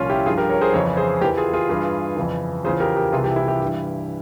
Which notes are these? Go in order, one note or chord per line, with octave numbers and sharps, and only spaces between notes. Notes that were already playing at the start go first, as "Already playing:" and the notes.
Already playing: C2 A#2 F3 C#4 F4
E4 G4
G2 F3 F4 G#4
G4 A#4
A#4 C#5
G#4 C5
F2 C#3 E3 A#4 C#5
G#4 C5
E2 E3 G4 A#4
F4 G#4
F4 G#4
G2 E3
F2 C#3 E3
E2 C#3 F3 G#4 C5
G4 A#4
G4 A#4
C2 C3 E3 F4 G#4
E4 G4
E4 G4
E4 G4
G2 E3